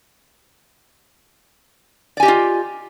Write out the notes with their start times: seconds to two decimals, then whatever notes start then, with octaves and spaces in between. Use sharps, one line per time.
2.17 D5
2.20 G#5
2.23 G4
2.25 D#5
2.28 F4